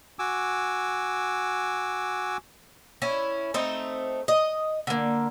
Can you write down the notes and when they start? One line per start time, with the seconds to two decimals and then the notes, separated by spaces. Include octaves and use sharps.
0.19 F#4 G#5 D6 E6
3.02 C#4 E4
3.54 A3 C4 D#4 C5
4.28 D#5
4.87 D3 A#3